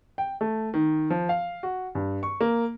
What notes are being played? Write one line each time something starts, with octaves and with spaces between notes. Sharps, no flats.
G5
A3
D#3
F3
F5
F#4
G2
C#6
A#3